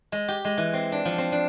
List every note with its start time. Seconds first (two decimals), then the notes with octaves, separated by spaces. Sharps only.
0.12 G#3
0.28 G4
0.45 G#3
0.57 E3
0.73 C4
0.92 D4
1.05 F3
1.18 C4
1.32 D4